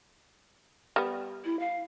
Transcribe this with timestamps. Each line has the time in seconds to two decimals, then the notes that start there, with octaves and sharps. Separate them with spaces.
0.96 G3 B3
1.45 E4
1.60 F5